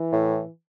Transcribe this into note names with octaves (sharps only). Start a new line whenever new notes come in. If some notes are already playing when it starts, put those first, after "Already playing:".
Already playing: E3
A2